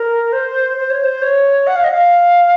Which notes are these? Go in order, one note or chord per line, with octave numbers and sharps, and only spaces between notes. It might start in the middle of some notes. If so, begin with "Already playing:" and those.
Already playing: A#4
C5
C5
C#5
C5
C#5
F#5
F5
D#5
F5